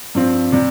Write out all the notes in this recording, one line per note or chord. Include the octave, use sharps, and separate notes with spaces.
G2 F3 C4
C3 G3